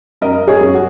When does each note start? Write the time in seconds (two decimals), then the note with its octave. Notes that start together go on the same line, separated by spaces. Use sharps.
0.21 F#2 A#4 D#5
0.47 G#4 C#5
0.61 F#2
0.74 F#4